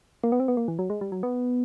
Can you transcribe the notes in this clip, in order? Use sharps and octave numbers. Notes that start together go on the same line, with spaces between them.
A#3
B3
C4
B3
A#3
E3
F#3
G#3
G3
F#3
B3